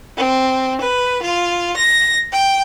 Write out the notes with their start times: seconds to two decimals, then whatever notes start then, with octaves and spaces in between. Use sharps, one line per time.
0.16 C4
0.80 B4
1.21 F4
1.76 A#6
2.32 G5